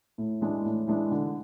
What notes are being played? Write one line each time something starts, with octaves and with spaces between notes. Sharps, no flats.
A2
E3 G#3 D4
A2
E3 G#3 D4
D3